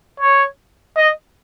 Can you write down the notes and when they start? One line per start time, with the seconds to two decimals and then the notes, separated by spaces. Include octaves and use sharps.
0.20 C#5
0.97 D#5